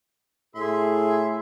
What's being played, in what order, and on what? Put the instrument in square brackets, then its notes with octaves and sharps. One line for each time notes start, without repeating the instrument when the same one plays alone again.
[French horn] A2 [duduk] G#4 [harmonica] E5 C6